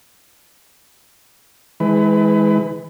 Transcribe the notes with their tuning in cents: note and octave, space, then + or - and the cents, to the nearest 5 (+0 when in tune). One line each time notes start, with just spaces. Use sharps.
E3 -40 G#3 +0 B4 +20